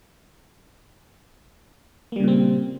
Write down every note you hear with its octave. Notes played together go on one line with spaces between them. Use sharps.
A#2 C#3 G3 A#3 C4